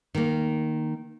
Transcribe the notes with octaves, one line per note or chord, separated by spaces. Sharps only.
D#3 A#3